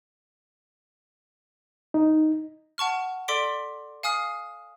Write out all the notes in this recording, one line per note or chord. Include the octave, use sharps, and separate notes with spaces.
D#4
F#5 A5 C#6 F6
A4 D5 C6 D6 B6 D7
F5 G#5 D#6 F6 C7